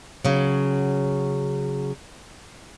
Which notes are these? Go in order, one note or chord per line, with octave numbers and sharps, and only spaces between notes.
C#3 F#3